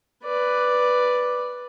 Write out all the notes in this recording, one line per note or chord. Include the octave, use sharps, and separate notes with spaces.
B4 D5